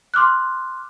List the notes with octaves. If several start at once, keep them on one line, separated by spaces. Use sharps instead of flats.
C6 D6 F6 F#6